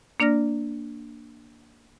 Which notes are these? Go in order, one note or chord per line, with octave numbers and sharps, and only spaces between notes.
A#3 D4 D5 F6 A#6